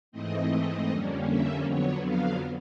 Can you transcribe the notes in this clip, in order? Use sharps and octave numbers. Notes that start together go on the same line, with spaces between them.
G#2 E3 A3 C4 D#5
F2 D3 G3 A#3 C#4
E5
F2 D3 F#3 B3 C#5
F5